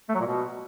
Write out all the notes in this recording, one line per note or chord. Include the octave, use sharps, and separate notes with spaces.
A3
F#3
A#2
B2